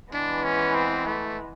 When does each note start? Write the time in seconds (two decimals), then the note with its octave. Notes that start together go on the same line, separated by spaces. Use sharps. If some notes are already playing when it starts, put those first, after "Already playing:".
0.13 E3 G#3 B3 D4
0.44 C#4
0.75 C4
1.06 A3